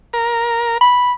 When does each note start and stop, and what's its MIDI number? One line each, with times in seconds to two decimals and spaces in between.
0.13 0.78 70
0.81 1.12 83